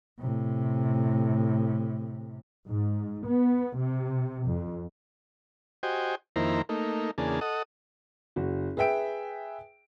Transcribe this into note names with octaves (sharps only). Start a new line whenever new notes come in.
A2 C3
G#2
B3
C3
F2
F#4 G4 C5 D#5 G5 G#5
F2 D#3 A#3 E4 C5 A#5
A3 A#3 D#4
E2 C#3 A#3 D4 G#4 A5
A4 D#5 F#5 D#6
F#1 F#4
G#4 B4 E5 G5 D7